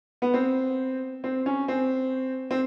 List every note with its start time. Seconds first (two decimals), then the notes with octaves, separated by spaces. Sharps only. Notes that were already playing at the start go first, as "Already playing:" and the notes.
0.22 B3
0.34 C4
1.24 C4
1.46 C#4
1.68 C4
2.51 C4